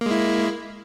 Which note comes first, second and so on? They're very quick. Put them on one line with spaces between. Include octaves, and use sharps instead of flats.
A#3 G#3 E4